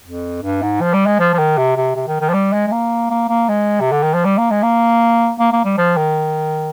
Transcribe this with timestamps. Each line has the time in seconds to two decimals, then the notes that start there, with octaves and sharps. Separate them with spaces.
0.05 F2
0.43 G2
0.62 G#2
0.81 F3
0.93 G3
1.06 G#3
1.19 F3
1.34 F3
1.38 D#3
1.58 C3
1.76 C3
1.96 C3
2.08 D#3
2.21 D#3
2.29 F3
2.34 G3
2.53 G#3
2.67 G#3
2.72 A#3
3.10 A#3
3.29 A#3
3.48 G#3
3.80 C3
3.92 D3
4.03 D#3
4.14 F3
4.25 G3
4.38 A#3
4.51 G#3
4.63 A#3
5.39 A#3
5.52 A#3
5.65 G3
5.78 F3
5.97 D#3